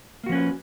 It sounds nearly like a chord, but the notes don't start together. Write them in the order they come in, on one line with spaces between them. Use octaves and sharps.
A#3 F#4 F3 C#4 B4